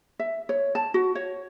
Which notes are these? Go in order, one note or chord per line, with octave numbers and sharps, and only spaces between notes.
E5
C#5
A5
F#4
C#5